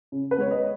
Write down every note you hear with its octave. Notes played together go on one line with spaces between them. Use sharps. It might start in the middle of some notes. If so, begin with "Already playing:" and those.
C#3
B4
G#3 B3 C#5
D#5